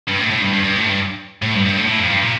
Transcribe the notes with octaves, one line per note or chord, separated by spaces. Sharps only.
G2
A2
A2
G2
G2
G2
A2
G2
A2
G2
G2
A2
A2
F2
G2
A#2